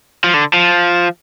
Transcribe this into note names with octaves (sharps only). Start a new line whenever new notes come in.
F3
D3
F3